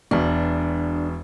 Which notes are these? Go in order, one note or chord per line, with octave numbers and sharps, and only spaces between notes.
E1 B2 D4